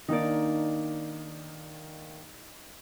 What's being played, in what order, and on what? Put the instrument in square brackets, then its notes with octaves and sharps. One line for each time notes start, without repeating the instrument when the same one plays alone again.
[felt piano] D#3 A#3 D4 [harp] D#4 D5